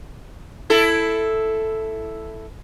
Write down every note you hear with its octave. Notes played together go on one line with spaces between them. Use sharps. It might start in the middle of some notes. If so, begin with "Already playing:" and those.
E4 A4